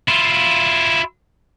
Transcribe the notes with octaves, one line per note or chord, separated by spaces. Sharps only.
E4 F4